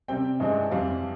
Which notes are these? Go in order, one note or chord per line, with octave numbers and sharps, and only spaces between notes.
C3 G3 C4 G5
G2 E3 G#3 C4
F2 E3 G3 C4 F5